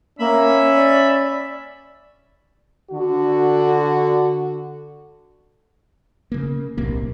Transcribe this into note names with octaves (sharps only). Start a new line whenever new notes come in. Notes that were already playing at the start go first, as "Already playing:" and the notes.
A#3 C#4 E5 B5
D5
D3 F#4
C#3 A#3
D1 B1 C3 A#3